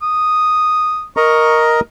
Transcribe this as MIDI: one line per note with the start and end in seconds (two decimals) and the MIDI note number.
0.02 1.05 87
1.17 1.80 70
1.17 1.80 75
1.17 1.80 82
1.17 1.63 85